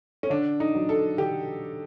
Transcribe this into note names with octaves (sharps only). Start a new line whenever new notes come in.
C#4
D3 D4
D#4
F#3
A4
D3 G4